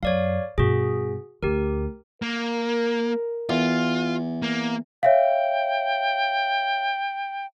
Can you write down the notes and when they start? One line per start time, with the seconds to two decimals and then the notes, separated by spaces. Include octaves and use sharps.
0.03 F#2 C#5 D5 F5
0.58 G2 B2 F#4 G#4
1.43 D2 G4 A#4
2.22 A#3 A#4
3.49 E2 F4
4.42 A#3
5.03 C#5 E5 F5 G5